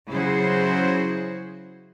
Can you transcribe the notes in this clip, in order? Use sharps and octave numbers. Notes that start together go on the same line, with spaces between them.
C#3 F#3 E4 F#4 G#4 C5